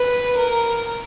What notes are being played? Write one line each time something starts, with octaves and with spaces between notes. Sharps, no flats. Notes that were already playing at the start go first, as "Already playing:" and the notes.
Already playing: B4
A#4